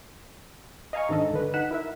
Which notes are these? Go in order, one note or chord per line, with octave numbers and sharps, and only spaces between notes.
D#5 F5 G#5 A#5 C#6
G#2 D#3 D4 A4 D#5
G1 D3 B4
D#4 F#5 F#6 B6 E7
E4 A#4 E5